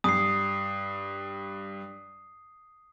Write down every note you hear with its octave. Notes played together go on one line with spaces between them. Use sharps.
G2 D#6 C7